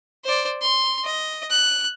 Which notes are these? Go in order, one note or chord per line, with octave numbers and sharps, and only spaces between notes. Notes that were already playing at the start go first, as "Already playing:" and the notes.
C5 D5
C6
D#5
F#6